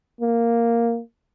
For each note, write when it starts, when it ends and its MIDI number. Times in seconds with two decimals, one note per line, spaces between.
0.21 1.00 58